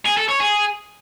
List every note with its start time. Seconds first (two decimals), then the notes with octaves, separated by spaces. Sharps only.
0.05 G#4
0.17 A4
0.28 C#5
0.40 G#4